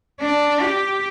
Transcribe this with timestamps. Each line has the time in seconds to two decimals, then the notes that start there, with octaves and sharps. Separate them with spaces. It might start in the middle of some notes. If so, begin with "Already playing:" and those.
0.21 D4
0.61 G4